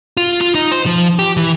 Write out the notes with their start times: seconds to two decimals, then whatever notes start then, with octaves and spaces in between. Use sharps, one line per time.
0.17 F4
0.41 F4
0.55 D#4
0.72 C5
0.86 F3
1.19 G4
1.37 E3